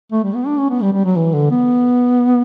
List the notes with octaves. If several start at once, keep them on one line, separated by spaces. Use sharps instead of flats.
A3
G3
B3
D4
C#4
B3
G3
G3
F#3
E3
D3
B3